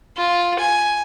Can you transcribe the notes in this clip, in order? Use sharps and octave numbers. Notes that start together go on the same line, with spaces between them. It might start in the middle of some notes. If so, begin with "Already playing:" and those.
F4
G#5